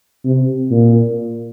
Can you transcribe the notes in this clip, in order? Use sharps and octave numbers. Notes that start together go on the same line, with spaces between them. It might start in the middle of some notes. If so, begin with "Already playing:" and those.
C3
A#2